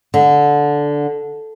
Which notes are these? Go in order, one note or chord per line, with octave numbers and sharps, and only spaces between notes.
D3